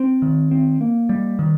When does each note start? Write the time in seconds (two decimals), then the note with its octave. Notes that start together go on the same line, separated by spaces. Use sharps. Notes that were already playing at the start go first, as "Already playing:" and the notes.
Already playing: C4
0.22 D#3
0.51 C4
0.81 A#3
1.09 G3
1.39 D#3